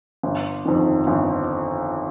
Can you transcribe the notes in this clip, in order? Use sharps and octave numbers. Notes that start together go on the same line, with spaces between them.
G1
F2 D#3
G1